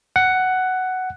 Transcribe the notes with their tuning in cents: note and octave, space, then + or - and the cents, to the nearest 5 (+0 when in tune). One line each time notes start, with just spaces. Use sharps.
F#5 +5